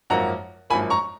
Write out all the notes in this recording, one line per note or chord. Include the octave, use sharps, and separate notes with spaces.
G#1 F#2 F3 A#3 F#5 A#5
G#1 F#2 F3 A#3 G#5 B5
A#5 C#6